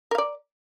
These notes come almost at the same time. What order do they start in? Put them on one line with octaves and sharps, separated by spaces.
A#4 F5 D5